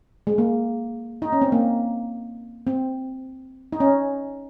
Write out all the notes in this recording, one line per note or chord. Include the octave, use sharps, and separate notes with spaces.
G#3
A#3
D#4
C#4
C4
A#3
C4
D#4
C#4